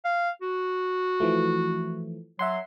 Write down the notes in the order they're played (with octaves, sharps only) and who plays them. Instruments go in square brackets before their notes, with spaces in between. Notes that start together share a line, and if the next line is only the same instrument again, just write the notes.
[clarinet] F5
F#4
[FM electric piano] E3 F3 A3
[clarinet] F#3 [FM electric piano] E5 F#5 C6